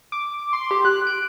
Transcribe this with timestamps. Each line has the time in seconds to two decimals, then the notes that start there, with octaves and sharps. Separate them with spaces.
0.12 D6
0.53 C6
0.71 G4
0.85 F#6
1.07 D7